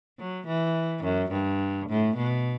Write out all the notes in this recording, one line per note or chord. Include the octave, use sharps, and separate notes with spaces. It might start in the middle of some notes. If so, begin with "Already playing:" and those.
F#3
E3
F#2
G2
A2
B2